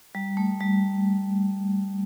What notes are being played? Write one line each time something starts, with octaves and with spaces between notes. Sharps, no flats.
G3
A3
G3